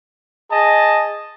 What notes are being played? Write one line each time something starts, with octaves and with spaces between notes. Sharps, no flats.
G#4 D#5 A5